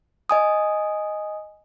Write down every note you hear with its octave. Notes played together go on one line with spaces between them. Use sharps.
D#5 G#5 D#6